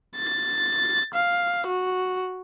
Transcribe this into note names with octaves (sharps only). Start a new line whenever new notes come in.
A6
F5
F#4